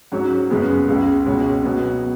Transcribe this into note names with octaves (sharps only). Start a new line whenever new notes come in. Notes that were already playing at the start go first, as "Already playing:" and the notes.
G#2 F#3 C#4
F#2 C#3 G#3 B3
C#2 C#3 G#3
C#2 B2 G#3 C#4
B2 F#3 B3